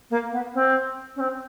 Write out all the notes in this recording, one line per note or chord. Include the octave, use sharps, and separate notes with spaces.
A#3
B3
C4
C#4
C4